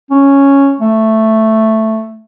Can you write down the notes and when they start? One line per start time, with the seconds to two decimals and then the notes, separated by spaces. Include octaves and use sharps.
0.11 C#4
0.80 A3